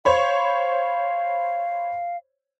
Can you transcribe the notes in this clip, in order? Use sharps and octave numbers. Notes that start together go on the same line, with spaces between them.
C5 C#5 F5 B5